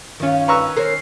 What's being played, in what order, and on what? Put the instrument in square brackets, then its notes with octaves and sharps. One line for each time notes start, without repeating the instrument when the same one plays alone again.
[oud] G2 F4 [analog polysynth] D#3 C#4
[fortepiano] B4 C#6 E6 [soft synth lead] A#5
[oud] A#4 C5 C#5 [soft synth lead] C7